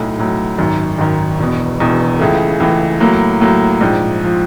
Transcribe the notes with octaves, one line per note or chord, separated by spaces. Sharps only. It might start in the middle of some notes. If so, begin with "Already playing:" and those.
Already playing: B1 A2 F#3
B1 A2 F#3
G#1 F#2 D#3
G#1 F#2 D#3
E1 E2 B2
E1 E2 B2
C#2 C#3 E3 A3
C#2 C#3 E3 A3
A2 F#3 A#3
A2 F#3 A#3
A#1 G#2 F3
F3